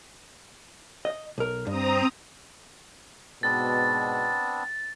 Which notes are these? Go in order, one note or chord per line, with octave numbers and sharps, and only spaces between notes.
D#5
B1 A#4
G2 C4 A#5 D#6
G#2 B2 B3 C4 D4 A6